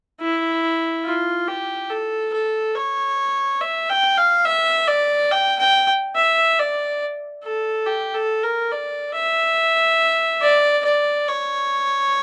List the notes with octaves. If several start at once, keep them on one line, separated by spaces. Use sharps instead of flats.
E4
F4
G4
A4
A4
C#5
E5
G5
F5
E5
D5
G5
G5
E5
D5
A4
G4
A4
A#4
D5
E5
D5
D5
C#5